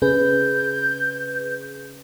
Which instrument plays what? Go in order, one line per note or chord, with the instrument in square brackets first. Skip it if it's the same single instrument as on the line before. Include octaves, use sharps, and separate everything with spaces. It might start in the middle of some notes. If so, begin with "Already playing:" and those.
[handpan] C#3 C4 C#4 [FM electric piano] G#4 B4 [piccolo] G6